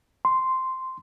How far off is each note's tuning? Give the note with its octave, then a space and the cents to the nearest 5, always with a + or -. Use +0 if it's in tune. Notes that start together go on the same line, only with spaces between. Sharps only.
C6 -5